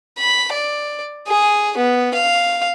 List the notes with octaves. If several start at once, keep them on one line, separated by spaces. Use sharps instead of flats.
B5
D5
G#4
B3
F5